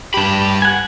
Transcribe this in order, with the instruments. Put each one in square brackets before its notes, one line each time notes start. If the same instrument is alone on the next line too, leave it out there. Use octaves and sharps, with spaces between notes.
[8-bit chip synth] G2 G4 [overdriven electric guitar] A5 B5
[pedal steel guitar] F#5 G#5